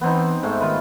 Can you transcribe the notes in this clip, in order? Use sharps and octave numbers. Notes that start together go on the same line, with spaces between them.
E3 B3 C4 D#4
G#2 A3
D#3 F4 B4